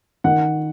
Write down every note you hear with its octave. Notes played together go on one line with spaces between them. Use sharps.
D#3 F#5